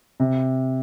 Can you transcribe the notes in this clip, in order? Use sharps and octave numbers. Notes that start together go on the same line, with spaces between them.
C3